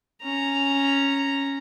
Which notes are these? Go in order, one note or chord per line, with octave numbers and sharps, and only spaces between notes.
C#4 A#5